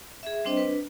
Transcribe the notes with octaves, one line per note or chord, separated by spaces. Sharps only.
G#4 E5
G3 C4 D4 C5 D#5
D4 B4